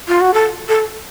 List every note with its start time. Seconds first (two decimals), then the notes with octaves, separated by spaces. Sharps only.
0.08 F4
0.21 F#4
0.34 A4
0.69 A4